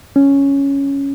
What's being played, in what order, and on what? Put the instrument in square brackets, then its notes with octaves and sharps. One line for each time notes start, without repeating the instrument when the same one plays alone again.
[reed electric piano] C#4